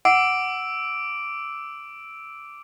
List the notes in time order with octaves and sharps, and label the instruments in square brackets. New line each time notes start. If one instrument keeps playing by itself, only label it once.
[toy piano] F#5 [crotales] D6 E6 D7